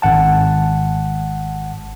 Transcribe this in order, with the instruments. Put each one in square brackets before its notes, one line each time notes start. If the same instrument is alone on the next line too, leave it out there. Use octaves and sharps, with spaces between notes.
[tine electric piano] G#1 F#5 A5